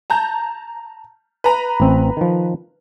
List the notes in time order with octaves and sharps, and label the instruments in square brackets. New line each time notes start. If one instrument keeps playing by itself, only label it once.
[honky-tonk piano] A5 A#5 G6
B4 A#5
[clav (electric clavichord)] A1 C4
D#3 F3